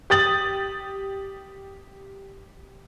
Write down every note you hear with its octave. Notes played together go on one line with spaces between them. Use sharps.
G4 D#6 A6 F#7